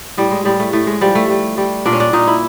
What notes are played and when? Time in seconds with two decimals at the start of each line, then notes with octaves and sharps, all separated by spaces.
0.17 A2 G3
0.31 G#3
0.45 A2 G3
0.60 A3
0.73 A2 A3
0.87 G#3
1.01 F3 G3
1.15 A3
1.30 G3
1.57 G3
1.86 A#2 D4
1.93 C#4
2.00 D4
2.13 A#2 D#4
2.27 E4